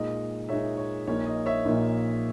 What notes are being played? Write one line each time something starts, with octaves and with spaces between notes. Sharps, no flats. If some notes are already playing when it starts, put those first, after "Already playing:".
Already playing: A#2 G#3 D#4 D#5
A#2 G#3 D#4 C#5 E5
C#5
A#1 A#2 A#3 D#4 C#5
D#5
C#5 E5
A#1 A#2 A#3 D#4